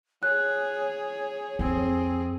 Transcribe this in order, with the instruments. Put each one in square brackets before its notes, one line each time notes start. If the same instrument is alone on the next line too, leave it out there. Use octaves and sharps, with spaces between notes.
[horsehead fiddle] G#4 [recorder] C#5 [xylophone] F#6
[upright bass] F2 [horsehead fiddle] C4 G#4